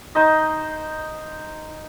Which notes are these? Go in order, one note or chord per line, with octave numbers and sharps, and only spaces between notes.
D#4 C5 D#5